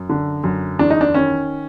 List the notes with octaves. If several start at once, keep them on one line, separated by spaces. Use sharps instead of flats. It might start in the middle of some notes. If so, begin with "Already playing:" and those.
Already playing: F#2
D3
F#2
E2 D4
D#4
D4
D#3 C#4